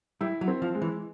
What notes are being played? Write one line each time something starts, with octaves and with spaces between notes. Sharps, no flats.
G3 E4
F#3
C4
F3
G#3
E3